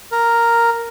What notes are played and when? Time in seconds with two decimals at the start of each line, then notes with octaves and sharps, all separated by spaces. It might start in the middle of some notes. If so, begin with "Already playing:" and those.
0.12 A#4